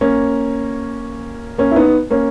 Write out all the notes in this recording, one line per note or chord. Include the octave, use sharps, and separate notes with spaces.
A#3 C#4
A#3 C#4
E4
B3 D#4
A#3 C#4